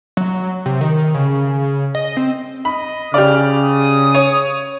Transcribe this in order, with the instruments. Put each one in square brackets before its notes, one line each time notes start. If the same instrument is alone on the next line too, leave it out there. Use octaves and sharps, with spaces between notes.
[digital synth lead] F#3
C3
D#3
C#3
D#5
C4
[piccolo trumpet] D#5 [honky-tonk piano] B5
[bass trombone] C#3 [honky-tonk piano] G4 D5 [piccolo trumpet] F6
[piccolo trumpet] D#6
[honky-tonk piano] C#5